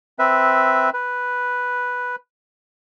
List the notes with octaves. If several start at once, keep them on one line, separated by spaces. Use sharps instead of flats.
C4 B4 E5
B4